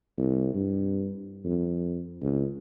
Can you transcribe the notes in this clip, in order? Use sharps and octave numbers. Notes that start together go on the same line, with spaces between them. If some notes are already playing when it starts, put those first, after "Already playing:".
C2
G2
F2
C#2